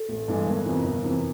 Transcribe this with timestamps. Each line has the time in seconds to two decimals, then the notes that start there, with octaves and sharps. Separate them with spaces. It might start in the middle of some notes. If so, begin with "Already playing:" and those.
Already playing: A4
0.09 A1
0.28 G2 E3 G#3
0.46 G1 A#4
0.66 F2 C3 E3
0.84 G1
1.04 F2 C3 E3